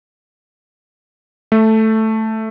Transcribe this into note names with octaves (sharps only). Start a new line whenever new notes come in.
A3